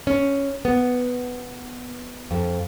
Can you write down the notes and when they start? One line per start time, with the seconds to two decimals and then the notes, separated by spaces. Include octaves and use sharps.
0.07 C#4
0.65 B3
2.31 F2